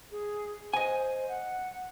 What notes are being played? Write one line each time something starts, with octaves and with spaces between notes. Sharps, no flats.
G#4
C5 D#5 G#5
F#5